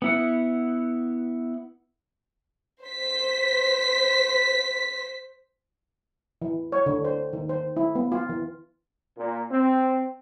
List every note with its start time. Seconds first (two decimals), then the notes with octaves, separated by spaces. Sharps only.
0.02 B3 E4 F#5
2.84 C5 B6
6.42 E3
6.72 C#5
6.86 D3
7.05 C5
7.33 D#3
7.49 C5
7.77 E4
7.95 B3
8.12 F4
8.29 E3
9.16 A#2
9.50 C4